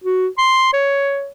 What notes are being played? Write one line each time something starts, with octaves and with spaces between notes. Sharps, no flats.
F#4
C6
C#5